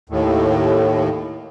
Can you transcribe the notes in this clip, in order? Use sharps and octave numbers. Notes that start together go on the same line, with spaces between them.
D#2 A2